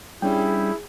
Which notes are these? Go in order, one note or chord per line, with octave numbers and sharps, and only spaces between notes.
G3 C#4 D4 E4 G#4 G5